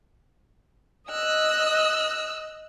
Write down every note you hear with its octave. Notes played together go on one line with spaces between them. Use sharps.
D#5 E6 F#6